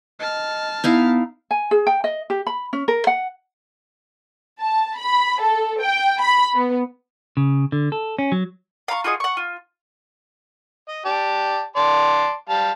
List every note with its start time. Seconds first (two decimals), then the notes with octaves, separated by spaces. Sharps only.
0.19 D#5 A5 F6
0.84 B3 D#4 E4 F5
1.51 G#5
1.71 G#4
1.87 G5
2.04 D#5
2.30 G4
2.47 B5
2.73 C#4
2.88 A#4
3.07 F#5
4.60 A5
4.97 B5
5.41 A4
5.81 G5
6.21 B5
6.55 B3
7.37 C#3
7.72 D3
7.92 A4
8.19 C#4
8.32 F#3
8.88 F5 A#5 C6 C#6
9.04 F4 F#4 G#4 D#5
9.20 F#5 C#6
9.37 F4
10.88 D#5
11.05 G4 D5 A5
11.76 D5 A5 C6
12.49 G3 F5 A5